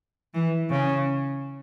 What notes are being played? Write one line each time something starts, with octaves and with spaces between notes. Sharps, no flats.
E3
C#3